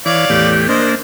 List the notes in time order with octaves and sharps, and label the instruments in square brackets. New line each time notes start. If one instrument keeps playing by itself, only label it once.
[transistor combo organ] E3 [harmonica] C#5 D5 F5
[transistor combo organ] E2 A2 G4
[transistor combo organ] A#3 D4 [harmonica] C5 D#5